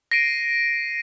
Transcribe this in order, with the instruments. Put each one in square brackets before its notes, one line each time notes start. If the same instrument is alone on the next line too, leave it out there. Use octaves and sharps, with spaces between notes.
[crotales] A#6 C7 D7 D#7